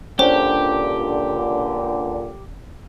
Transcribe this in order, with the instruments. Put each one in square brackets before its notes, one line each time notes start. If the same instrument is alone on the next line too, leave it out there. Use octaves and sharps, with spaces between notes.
[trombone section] C#2 A#2 D3 [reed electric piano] C#4 D4 [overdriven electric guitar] G4 [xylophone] C5